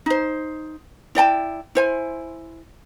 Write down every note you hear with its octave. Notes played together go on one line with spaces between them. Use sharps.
D#4 C5
E4 D5 G5 A5
E4 C5 G#5